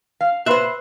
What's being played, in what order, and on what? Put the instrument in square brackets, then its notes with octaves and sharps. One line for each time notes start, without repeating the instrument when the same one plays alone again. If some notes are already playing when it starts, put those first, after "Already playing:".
[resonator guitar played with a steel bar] F5
[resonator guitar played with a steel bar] A#2 [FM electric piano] B4 C6 F#6 [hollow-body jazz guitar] C5 E5